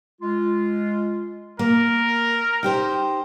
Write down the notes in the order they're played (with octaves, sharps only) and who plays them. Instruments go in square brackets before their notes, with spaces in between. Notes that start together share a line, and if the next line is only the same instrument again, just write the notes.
[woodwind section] G#3 F4
[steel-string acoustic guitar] A#3 [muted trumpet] A#4
[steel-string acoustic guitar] D#4 G4 C5